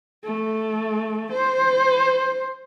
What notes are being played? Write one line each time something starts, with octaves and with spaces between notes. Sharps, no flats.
A3
C5